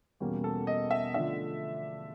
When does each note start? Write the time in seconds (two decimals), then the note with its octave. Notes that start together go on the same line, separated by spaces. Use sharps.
0.20 E2 B2 G3 A#3 C#4
0.44 A4
0.67 D#5
0.91 E5
1.14 D3 F3 A3 D4 E5